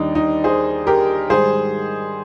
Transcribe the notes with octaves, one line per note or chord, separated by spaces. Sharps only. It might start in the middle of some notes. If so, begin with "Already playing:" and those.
Already playing: D#2 D#3 G3 D4 D#4
D#4
G#4 C5
G4 A#4
G#2 D#3 G3 G#4 C5